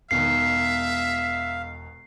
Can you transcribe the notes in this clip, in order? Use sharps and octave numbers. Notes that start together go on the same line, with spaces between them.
E1 B2 D#3 E5 F5 C7